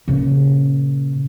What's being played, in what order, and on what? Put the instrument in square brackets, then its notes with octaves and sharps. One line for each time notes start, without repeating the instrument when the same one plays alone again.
[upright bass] A#2 C#3